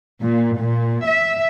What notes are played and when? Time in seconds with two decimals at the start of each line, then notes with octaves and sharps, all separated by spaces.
0.21 A#2
0.60 A#2
1.06 E5